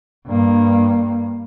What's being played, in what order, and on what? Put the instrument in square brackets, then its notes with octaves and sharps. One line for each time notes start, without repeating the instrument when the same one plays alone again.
[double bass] G2 A#3